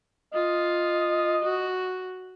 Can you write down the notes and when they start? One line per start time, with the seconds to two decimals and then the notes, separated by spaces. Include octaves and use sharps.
0.34 F4 D#5
1.44 F#4